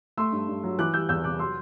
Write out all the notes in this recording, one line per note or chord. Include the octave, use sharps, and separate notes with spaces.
A3 C6 E6
G2
G2
F#3
E3 D6 F#6
G3 E6 G6
E2 E6 G6
C3 D6 F#6
F#3 C6 E6